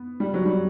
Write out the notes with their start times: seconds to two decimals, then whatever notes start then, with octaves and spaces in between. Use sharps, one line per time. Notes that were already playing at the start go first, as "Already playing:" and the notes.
Already playing: B3
0.20 G3
0.34 F#3
0.45 G3